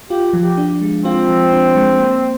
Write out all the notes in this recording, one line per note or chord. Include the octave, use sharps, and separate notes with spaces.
F4 G4
F3
G4
D4
G#3
C4 F4
F3
D4
G#3
A#3